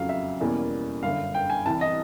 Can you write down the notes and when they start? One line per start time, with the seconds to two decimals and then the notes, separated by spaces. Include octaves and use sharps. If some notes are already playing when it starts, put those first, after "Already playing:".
Already playing: F#1 F2 C#3 F#3 F5
0.09 E5
0.41 E2 B2 G3 A#3 C#4
1.03 G1 F#2 D3 F5
1.34 G5
1.50 G#5
1.66 C2 C3 E3 G3 A5
1.81 D#5